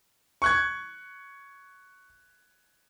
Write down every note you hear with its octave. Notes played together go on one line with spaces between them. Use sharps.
C#6 F#6 G#6